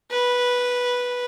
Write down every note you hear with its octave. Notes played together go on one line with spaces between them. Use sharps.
B4